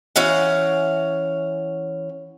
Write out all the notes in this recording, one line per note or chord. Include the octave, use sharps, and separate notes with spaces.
E3 C#4 F5 F#5